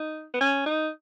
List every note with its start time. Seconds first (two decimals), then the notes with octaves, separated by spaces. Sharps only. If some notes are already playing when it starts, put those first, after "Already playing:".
Already playing: D#4
0.34 B3
0.41 C#4
0.66 D#4